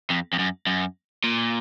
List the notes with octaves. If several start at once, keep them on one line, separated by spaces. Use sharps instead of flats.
F2
F2
F#2
F#2
A#2